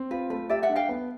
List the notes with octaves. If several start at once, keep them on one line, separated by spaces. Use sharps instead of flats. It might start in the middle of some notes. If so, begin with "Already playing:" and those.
Already playing: C4
F4 B4
A3 B4
G4 D5 E5
E5 F#5
D4
F5 G5
B3